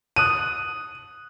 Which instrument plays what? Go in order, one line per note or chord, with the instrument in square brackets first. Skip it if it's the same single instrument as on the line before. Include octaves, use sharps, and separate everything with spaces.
[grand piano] D#6 F#6 D#7